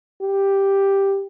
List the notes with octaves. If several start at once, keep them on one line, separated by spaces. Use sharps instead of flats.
G4